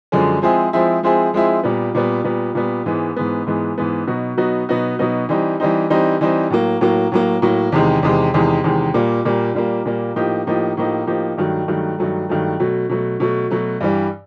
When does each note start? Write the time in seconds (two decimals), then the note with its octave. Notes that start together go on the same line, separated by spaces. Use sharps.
0.12 F#2 D3 F3 G#3 C#4
0.42 F3 G#3 C4 E4 G#4
0.73 F3 G#3 C4 E4 G#4
1.03 F3 G#3 C4 E4 G#4
1.33 F3 G#3 C4 E4 G#4
1.63 A#2 G3 B3
1.95 A#2 G3 B3
2.24 A#2 G3 B3
2.55 A#2 G3 B3
2.86 G#2 E3 G#3 B3
3.16 G#2 E3 G#3 B3
3.47 G#2 E3 G#3 B3
3.78 G#2 E3 G#3 B3
4.07 B2 F#3 B3 D#4 F#4
4.37 B2 F#3 B3 D#4 F#4
4.69 B2 F#3 B3 D#4 F#4
4.99 B2 F#3 B3 D#4 F#4
5.29 E3 G3 C4 D#4
5.60 E3 G3 C4 D#4
5.90 E3 G3 C4 D#4
6.21 E3 G3 C4 D#4
6.50 A2 F#3 A#3
6.81 A2 F#3 A#3
7.12 A2 F#3 A#3
7.42 A2 F#3 A#3
7.72 E2 C3 D#3 G#3
8.03 E2 C3 D#3 G#3
8.34 E2 C3 D#3 G#3
8.64 E2 C3 D#3 G#3
8.94 A#2 G3 A#3
9.25 A#2 G3 A#3
9.55 A#2 G3 A#3
9.85 A#2 G3 A#3
10.16 A2 F3 A#3 D#4 G4
10.47 A2 F3 A#3 D#4 G4
10.77 A2 F3 A#3 D#4 G4
11.07 A2 F3 A#3 D#4 G4
11.38 G2 D#3 F#3 A3
11.68 G2 D#3 F#3 A3
11.98 G2 D#3 F#3 A3
12.29 G2 D#3 F#3 A3
12.60 B2 F#3 A3
12.89 B2 F#3 A3
13.20 B2 F#3 A3
13.50 B2 F#3 A3
13.81 G2 E3 G3